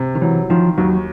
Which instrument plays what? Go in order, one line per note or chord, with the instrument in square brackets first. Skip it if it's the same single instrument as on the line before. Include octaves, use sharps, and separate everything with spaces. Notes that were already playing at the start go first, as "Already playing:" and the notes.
Already playing: [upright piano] C3
[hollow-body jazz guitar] D#3
[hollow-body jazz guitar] E3 [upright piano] F#3
[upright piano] D#3 [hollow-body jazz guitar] F3
[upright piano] D#2 [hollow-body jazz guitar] F#3